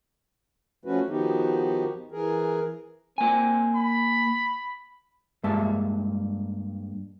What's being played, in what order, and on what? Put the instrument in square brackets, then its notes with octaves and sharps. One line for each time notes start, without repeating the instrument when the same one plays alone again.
[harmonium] F3 A3 C#4 F#4 B4
D#3 F3 B3 D#4 F#4 G4
E3 G#4 A#4
[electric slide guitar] A#3 G#5 [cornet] C4
[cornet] B5
[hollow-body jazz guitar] G2 G#3 A#3 E5 A5